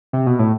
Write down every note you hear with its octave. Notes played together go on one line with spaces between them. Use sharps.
C3
B2
A2